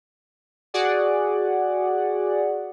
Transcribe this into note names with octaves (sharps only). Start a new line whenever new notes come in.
F#4 G#4 D5 F#5